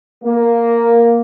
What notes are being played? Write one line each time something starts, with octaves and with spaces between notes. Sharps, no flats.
A#3